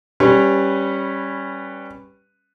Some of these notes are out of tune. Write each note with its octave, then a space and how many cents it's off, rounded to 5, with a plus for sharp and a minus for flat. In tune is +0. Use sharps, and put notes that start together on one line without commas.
G3 +0 C#4 -15 B4 +0